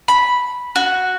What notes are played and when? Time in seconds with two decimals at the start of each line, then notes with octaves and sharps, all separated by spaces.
0.08 B5
0.76 F#4